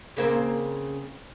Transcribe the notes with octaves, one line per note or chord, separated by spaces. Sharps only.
C#3 A#3 C4